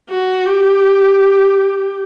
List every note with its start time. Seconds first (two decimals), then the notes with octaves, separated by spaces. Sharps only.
0.10 F#4
0.45 G4